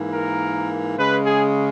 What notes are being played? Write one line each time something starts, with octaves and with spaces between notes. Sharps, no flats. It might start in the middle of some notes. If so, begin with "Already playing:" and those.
Already playing: G#2 E3 A#3
A#4
C#3 G#3 B4
G#4